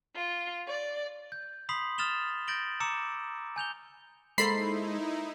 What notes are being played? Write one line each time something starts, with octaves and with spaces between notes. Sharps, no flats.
F4
D5
G6
B5 C6 D#6 B6 C7 F#7
D#6 F6 A6 E7 F7 G7
G6 A6 A#6 D7 F#7 G7
A#5 D6 E6 C#7 E7
G#5 G6 F7 G7
G#3 A#3 D#4 E4 A4 C5 B5 C7